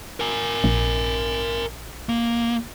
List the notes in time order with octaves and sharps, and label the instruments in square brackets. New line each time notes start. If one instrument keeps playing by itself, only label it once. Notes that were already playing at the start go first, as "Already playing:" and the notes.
[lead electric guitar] A#4 G#5
[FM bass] A#1
[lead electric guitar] A#3